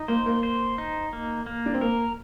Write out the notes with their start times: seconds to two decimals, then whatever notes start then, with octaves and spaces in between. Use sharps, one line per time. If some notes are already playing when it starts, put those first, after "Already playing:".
Already playing: D#4
0.08 A#3 C5
0.26 A#3
0.43 C5
0.78 D#4
1.13 A#3
1.47 A#3
1.66 D4
1.74 C4
1.81 A#3 A#4